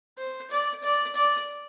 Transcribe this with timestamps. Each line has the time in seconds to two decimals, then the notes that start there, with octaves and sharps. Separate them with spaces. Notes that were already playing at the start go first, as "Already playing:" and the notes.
0.18 C5
0.50 D5
0.83 D5
1.16 D5